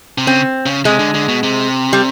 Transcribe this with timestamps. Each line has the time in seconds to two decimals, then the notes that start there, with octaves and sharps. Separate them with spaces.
0.18 C3
0.27 C#3 C4
0.66 C#3
0.85 C3 G#3
0.99 D3
1.15 D3
1.28 B2
1.43 C3
1.93 G3